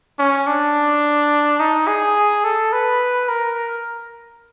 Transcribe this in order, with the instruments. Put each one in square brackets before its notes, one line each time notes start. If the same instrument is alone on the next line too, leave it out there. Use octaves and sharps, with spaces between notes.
[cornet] C#4
D4
D#4
G#4
A4
B4
A#4